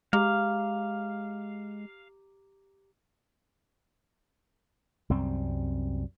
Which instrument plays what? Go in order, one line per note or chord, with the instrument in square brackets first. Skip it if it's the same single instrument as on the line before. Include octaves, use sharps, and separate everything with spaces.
[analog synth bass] G#3 [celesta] G4 A#5 D6 [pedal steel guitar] F5
[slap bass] C2 F#2 G3 C4